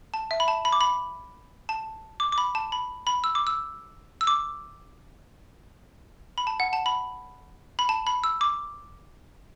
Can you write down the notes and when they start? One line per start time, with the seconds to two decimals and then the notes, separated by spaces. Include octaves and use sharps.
0.14 A5
0.31 E5
0.40 B5
0.48 A5
0.65 B5
0.72 D6
0.81 B5
1.69 A5
2.20 D6
2.32 D6
2.38 B5
2.55 A5
2.72 B5
3.07 B5
3.24 E6
3.35 D6
3.47 E6
4.21 E6
4.27 D6
6.38 B5
6.47 A5
6.60 F#5
6.73 A5
6.86 B5
7.79 B5
7.89 A5
8.07 B5
8.24 E6
8.41 D6